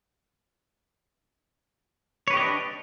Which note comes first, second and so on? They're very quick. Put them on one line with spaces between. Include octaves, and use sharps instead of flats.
C#5 B4 G4 D#5 D4